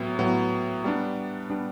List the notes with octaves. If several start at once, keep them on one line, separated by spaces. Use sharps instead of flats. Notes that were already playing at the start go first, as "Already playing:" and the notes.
Already playing: A2 F#3 B3
A2 F#3 B3
G3 B3 D4
G3 B3 D4